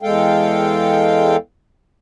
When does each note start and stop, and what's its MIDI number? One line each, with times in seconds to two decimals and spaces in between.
0.02 1.37 40
0.02 1.37 56
0.02 1.37 69
0.02 1.37 77
0.02 1.37 79